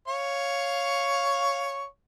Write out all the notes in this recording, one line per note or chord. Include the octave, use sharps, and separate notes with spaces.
C#5 F5 C#6